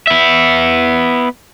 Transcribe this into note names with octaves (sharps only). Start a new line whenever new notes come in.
B3 E5